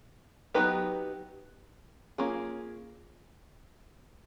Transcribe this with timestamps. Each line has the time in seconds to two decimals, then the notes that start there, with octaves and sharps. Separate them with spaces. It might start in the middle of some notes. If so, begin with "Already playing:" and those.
0.54 F#3 B3 D#4 G4 B4
2.18 A#3 C#4 F4 G#4